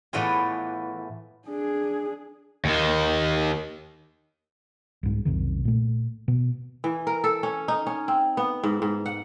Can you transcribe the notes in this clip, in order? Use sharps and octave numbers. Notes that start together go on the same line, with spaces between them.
A2 E3 A3 B3 F4 G#4
D4 G#4
D#2 D#3
C2 G#2
B1 F2 C3 D#3
A#2 A3
B2
E3
A#4
A4
C#4
D#4
C#4
C4
B3
G#2
G#2
F#5